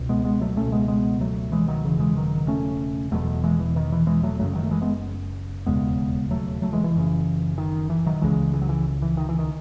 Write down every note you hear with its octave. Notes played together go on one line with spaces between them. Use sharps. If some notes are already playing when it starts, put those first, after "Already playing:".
Already playing: C#2 B2
G#3 B3
G#3 B3
F#3 A3
C#2 B2 A3 C#4
G#3 B3
G#3 B3
F#3 A3
E3 G#3
D#3 F#3
E1 D#2 C#3 E3
E3 G#3
D#3 F#3
A3 C#4
E1 E2 B2 F#3 A3
E3 G#3
E3
D#3
E3
E3 G#3
F#3 A3
F#1 F#2 C#3 F#3 A3
D#3 F#3
A3
E3 G#3
G#3 B3
E1 D#2 C#3 G#3 B3
F#3 A3
F#3 A3
E3 G#3
E3
F#1 F#2 C#3
D#3
E3
D#3 F#3
C#2 C#3 E3 G#3
E3
F#3
E3
E3
D#3
E3
D#3